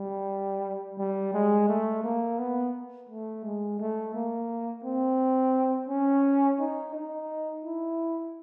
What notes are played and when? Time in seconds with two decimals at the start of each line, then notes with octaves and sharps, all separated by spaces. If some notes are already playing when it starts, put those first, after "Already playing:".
Already playing: G3
0.98 G3
1.33 G#3
1.68 A3
2.04 A#3
2.38 B3
3.09 A3
3.44 G#3
3.79 A3
4.14 A#3
4.84 C4
5.89 C#4
6.59 D#4
6.94 D#4
7.65 E4